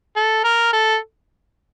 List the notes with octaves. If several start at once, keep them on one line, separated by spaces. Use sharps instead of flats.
A4
A#4
A4